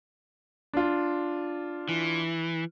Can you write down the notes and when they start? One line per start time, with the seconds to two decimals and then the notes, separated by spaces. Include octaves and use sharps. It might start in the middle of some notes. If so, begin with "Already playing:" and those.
0.74 D4 F4
1.89 E3